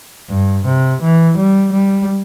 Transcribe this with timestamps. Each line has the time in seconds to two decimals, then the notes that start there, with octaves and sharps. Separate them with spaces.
0.30 G2
0.65 C3
1.02 E3
1.37 G3
1.73 G3